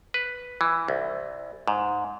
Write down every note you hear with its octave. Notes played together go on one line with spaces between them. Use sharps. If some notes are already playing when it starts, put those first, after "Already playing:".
B4
E3
C2
G#2